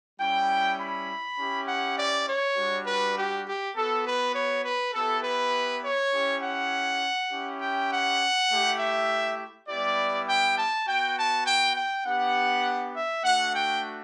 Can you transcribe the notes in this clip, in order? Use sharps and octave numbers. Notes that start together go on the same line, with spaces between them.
G3 C#4 E4 G5
B5
C#4 E4 G4
F#5
D5
C#5
G3 D4 F#4
B4
G4
G4
B3 F#4 A4
B4
C#5
B4
B3 E4 G4 A4
B4
C#5
C#4 E4 G4
F#5
C#4 E4 G4
G5
F#5
A3 E4 G4
E5
G3 B3 E4 G4 D5
G5
A5
B3 F#4 G5
A5
G5
G5
B3 D4 G4 F#5
E5
A3 D4 F#4 F#5
G5